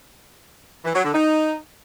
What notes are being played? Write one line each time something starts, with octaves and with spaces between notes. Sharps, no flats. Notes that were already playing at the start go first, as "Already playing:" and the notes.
E3
F#3
D3
D#4